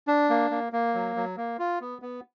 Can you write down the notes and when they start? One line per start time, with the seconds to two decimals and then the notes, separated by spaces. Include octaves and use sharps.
0.08 D4
0.30 A#3
0.51 A#3
0.73 A#3
0.94 F#3
1.16 F#3
1.37 A#3
1.59 F4
1.81 B3
2.02 B3